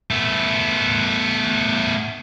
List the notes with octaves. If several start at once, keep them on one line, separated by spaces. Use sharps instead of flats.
A3 B3